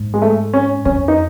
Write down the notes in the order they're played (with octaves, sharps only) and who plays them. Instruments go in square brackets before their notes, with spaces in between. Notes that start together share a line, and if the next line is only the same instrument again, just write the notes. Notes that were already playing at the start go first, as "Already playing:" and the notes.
Already playing: [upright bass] G#2
[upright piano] G#3
A3
C#4
[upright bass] F2 [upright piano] C#4
[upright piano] D#4